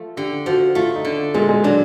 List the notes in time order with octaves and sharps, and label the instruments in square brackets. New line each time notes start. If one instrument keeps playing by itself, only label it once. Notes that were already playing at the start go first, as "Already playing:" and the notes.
Already playing: [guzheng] F3 A3
[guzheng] D3 [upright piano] G4
[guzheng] F3 [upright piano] F#4
[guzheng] A3 [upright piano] F4
[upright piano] D#4
[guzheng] D3
[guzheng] A#2 [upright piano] G#3
[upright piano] G#3
[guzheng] F#3 [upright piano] D4